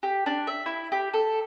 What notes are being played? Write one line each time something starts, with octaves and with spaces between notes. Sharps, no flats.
G4
D4
E5
E4
G4
A4